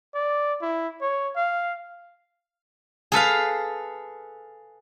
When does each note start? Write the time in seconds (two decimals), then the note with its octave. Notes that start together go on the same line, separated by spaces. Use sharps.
0.14 D5
0.62 E4
1.01 C#5
1.36 F5
3.12 G#4 A4 B4 F5